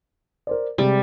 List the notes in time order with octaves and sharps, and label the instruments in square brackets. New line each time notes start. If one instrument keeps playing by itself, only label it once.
[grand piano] A#4 C5 D5
[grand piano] C3 G#3 [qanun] G3